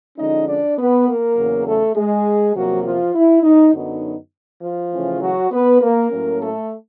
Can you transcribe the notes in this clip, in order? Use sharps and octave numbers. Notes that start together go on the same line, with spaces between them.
D3 F3 G#3 C#4 D#4 D#5
D4 D5
B3 B4
A#3 A#4
E2 C#3 F#3
A3 A4
G#3 G#4
E2 C3 F3 F#3 A#3 F#4
F3 F4
E4
D#4
F#2 D3 F#3 B3 D#4
F3 F4
C#3 E3 A3 C#4
F#3 F#4
B3 B4
A#3 A#4
A2 F#3 A#3 C#4
A3 A4